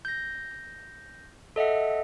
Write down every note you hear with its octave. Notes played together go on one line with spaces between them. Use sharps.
G6 A#6
A4 D#5 E5 F#5